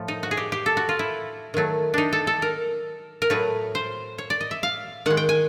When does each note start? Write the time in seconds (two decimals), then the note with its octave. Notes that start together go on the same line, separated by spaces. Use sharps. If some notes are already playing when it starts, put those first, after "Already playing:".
Already playing: A2 F3 A3
0.08 D#4
0.23 F#4
0.31 G#4
0.37 G4
0.52 G4
0.66 A4
0.77 F#4
0.89 F4
0.99 E4
1.54 D#3 F#3 A3
1.94 D4 D#4
2.13 A4
2.27 A4
2.42 A#4
3.22 A#4
3.30 A2 F#3 A3 B4
3.75 C5
4.18 C#5
4.30 D5
4.41 D#5
4.51 E5
4.63 F5
5.06 D#3 G#3 F#5
5.17 G5
5.29 G#5